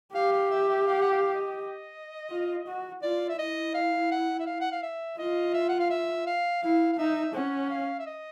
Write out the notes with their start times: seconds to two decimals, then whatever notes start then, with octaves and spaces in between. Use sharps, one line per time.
0.14 G4 F5
0.32 F5
0.51 E5
0.69 E5
0.87 F5
1.01 F#5
1.11 F5
1.35 D#5
2.30 F4
2.67 F#4
3.03 F4 D5
3.29 E5
3.39 E4 D#5
3.74 F5
4.11 F#5
4.40 E5
4.47 F5
4.61 F#5
4.72 F5
4.83 E5
5.18 F4 D#5
5.54 E5
5.69 F#5
5.80 F5
5.90 E5
6.27 F5
6.63 E4 F5
6.93 F5
6.98 D#4 E5
7.34 C#4 F#5
7.70 F5
8.00 E5
8.06 D#5